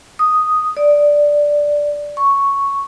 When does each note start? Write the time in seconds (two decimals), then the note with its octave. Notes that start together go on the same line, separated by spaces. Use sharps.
0.19 D#6
0.77 D5
2.17 C#6